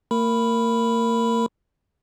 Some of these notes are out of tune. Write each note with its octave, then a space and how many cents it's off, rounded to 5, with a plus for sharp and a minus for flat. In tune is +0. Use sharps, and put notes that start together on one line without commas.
A#3 -40 A#4 -10 B5 +0